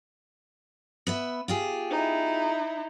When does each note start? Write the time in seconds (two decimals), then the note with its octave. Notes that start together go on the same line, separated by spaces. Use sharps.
1.07 B3 B4 E5
1.48 F4 G4 G#4
1.91 D#4 E4